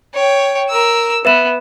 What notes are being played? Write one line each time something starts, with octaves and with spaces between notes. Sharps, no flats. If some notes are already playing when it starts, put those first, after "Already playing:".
C#5 G5
A#4 E6
B3 B4 E5 E7